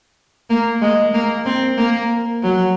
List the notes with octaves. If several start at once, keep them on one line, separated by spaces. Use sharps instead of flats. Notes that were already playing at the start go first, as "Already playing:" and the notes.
A#3
G#3
A#3
C4
A#3
F#3